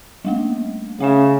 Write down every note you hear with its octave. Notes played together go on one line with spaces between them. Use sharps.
G3 A3 A#3
C#3 A3 E5 E7